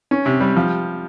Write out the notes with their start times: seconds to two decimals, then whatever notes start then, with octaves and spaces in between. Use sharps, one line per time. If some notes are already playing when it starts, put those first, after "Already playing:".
0.11 C#4
0.26 C3
0.41 G3
0.57 F3